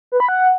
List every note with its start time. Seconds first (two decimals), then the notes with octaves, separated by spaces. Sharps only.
0.12 B4
0.20 B5
0.29 F#5